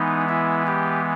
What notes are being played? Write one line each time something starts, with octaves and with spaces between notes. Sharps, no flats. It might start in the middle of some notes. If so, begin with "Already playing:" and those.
Already playing: E3 G#3 B3 D#4
E4
G4